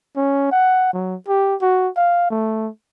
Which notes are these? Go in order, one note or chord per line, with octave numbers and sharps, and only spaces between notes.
C#4
F#5
F#3
G4
F#4
F5
A3